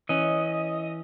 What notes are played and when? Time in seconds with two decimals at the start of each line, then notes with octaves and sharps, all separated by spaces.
0.09 E3 C#4 D#5